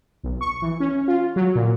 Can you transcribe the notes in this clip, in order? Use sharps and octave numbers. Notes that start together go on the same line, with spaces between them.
B1
C#6
E3
C#4
F4
F#3
A#2